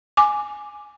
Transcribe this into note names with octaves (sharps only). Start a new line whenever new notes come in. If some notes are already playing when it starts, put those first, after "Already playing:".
G#5 D6